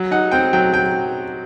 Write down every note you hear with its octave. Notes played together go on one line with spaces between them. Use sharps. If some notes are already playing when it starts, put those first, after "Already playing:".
Already playing: F#3
D#4 F#5
C4 G5
F#3 G5
F#3 G5